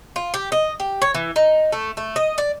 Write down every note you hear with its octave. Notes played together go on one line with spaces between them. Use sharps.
F4
G4
D#5
G4
C#5
E3
D#4
A3
A3
D#5
D5